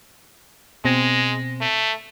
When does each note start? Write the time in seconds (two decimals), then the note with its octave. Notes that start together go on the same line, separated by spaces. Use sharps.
0.85 B2 G#3 C4 A#6
1.61 A3